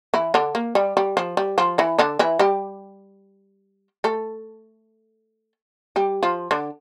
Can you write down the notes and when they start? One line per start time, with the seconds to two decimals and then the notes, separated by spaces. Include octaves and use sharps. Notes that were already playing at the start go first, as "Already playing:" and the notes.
0.14 E3 E4
0.34 D3 D4
0.55 A#3
0.75 G3
0.97 G3
1.17 F3
1.37 G3
1.58 F3 F4
1.78 E3 E4
1.99 D3 D4
2.19 E3 E4
2.39 G3 G4
4.04 A3 A4
5.96 G3 G4
6.23 F3 F4
6.51 D3 D4